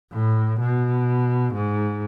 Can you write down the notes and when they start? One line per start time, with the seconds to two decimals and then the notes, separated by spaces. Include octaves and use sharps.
0.13 A2
0.60 B2
1.54 G#2